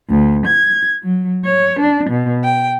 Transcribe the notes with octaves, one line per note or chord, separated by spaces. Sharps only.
D2
G#6
F#3
C#5
D4
B2
G5